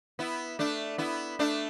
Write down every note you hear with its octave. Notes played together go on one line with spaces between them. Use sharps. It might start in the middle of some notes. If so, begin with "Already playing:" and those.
B3 E4
A3 D4
B3 E4
A3 D4